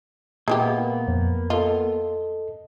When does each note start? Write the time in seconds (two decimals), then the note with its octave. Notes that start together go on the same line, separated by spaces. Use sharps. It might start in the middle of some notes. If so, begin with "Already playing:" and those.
0.48 A#2 G#3 A#3 B3 E4 G4
1.08 F2
1.50 F4 A4 D#5